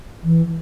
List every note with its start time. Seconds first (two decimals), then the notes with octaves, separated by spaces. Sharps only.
0.24 E3